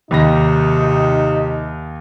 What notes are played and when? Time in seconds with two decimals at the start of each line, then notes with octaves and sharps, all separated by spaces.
0.11 D#2 C3 D#4 B5 A#6